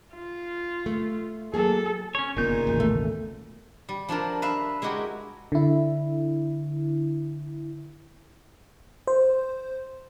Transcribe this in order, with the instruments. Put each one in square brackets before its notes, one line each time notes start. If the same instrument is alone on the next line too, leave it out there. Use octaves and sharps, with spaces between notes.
[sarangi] F4
[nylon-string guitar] A3
[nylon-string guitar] F#3 A#3 G#4 [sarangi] A4
[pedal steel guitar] C#4 C#5
[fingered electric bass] G1 B3 [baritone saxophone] A#2 [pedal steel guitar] C#3 D#4 G6
[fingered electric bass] A1 D#2 B2
[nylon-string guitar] A3
[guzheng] G3
F3 D4 F4 A#4
B4 E5 F5
G#3 E4 F#4 G4 A#4
[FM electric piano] D3 E4
C5